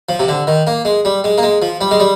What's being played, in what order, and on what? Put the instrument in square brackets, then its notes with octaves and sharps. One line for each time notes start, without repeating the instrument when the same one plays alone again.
[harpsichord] F3
C3
D3
D#3
A#3
G#3
G3
G#3
A#3
G#3
F3
G3
G#3
G3